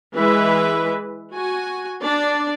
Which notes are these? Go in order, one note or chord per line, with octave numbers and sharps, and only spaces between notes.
E3 G#3 B4 E5
F#4 G#5
D4 D5